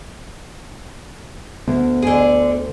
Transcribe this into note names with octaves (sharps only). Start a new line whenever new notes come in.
D2 B3
D3 G#4